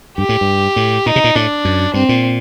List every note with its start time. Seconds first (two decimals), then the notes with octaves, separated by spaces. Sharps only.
0.18 G2 G4
0.29 A2
0.41 G2
0.76 A2
1.06 A#2 D#4
1.16 C3
1.24 A#2
1.35 A2 D4
1.65 F#2
1.94 G2 C4
2.09 A#2